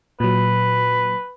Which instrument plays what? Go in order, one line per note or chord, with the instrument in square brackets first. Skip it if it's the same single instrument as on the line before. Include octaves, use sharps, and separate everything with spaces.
[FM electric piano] A#2 F#3 [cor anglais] B4